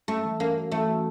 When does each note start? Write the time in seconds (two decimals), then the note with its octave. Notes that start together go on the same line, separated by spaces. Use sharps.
0.08 A3 C#4
0.25 E3
0.40 A#3 C#4
0.57 F#4
0.72 E3 A3
0.89 F#4